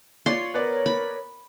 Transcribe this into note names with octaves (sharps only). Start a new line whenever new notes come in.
F4 C#5 D5 C6
B3 A#4 B4 C#5 D5
B5